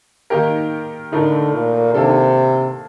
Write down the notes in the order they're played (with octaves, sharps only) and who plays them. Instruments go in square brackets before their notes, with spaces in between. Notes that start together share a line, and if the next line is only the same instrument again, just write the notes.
[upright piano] D#3 A#3 D#4 G4 A#4
[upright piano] A2 A3 D#4 A#4 [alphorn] D3
[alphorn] A#2
[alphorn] C3 [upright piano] D#3 A#3 D4 A4